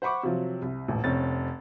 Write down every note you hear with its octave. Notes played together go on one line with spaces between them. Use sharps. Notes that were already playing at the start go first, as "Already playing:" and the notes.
C5 F#5 B5 C#6 D6
C3 F3 F#3
C2
D#1 A1
F1 C4 C#4 A6